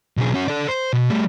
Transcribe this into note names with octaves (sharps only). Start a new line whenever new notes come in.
B1 G#4
C#4 F#4
A4 D5
C5
B2
G3 A3